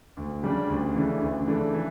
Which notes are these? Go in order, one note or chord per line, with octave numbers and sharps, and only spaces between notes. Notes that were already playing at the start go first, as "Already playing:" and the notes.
D2
C#3 G3 D4
D2
C#3 E3 A3 D4
D2
C#3 E3 A3 D4
E3